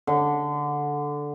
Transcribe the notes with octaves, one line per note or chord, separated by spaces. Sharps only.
D3